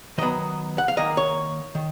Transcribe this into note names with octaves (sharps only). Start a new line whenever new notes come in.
D#3 F#3 B3 D#5
F#5
F5
D#3 A#3 D#5
C#5
D#3